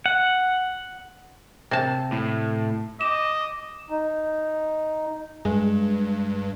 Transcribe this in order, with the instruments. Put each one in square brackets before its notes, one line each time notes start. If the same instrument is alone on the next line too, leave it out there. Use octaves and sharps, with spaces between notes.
[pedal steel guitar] F#5
[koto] C3 A5
[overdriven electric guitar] A2
[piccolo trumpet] D#5 [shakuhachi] D6 [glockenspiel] E7
[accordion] D#4
[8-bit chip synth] G2 [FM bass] G#3